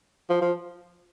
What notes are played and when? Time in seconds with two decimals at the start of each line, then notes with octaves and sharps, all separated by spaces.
0.29 F3
0.41 F3